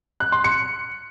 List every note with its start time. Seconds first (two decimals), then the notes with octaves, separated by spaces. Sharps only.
0.20 F#6
0.32 C6
0.44 C#7